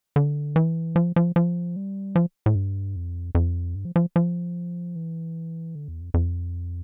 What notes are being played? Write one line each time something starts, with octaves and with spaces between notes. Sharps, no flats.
D3
E3
F3
F3
F3
G3
F3
A2
G2
F2
F2
G2
F3
F3
F3
E3
D3
E2
F2
F2